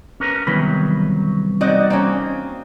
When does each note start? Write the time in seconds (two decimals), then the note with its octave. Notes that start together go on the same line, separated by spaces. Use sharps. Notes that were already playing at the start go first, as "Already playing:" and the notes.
0.20 C#4 A#4 B4
0.47 C2 B2 D#3 E3 F#3 B5
1.61 C4 D#4 F#4 D5 D#5
1.90 A#3 C4 C#4